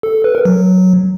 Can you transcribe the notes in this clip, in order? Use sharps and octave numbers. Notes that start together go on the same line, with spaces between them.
A4
A4
B4
A#4
F#3